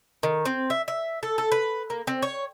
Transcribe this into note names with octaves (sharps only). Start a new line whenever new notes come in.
D#3
C4
E5
E5
A4
A4
B4
A#3
C4
C#5